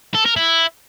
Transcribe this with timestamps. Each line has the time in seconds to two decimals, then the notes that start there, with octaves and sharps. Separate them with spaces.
0.14 A4
0.25 A#4
0.36 E4